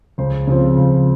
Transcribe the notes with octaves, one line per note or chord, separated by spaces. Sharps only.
C#2 C5
C#3 F3 C4
C#2